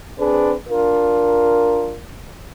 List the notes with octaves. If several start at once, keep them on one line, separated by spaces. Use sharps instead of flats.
C4 D4 G#4 B4
D4 F4 A#4